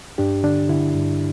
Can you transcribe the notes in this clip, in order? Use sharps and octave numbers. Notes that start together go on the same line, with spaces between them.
G2 D4 G4
D3 D4
D3 E4
G2